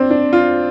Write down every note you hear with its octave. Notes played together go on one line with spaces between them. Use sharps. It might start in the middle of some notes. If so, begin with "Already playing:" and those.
Already playing: C4 D4
D4
F4